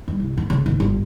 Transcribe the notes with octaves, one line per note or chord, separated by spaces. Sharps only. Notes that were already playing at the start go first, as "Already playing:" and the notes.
G2
C2
G#2
C#3
G#1
G1